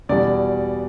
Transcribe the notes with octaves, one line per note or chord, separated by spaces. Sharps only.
E2 B2 G3 D5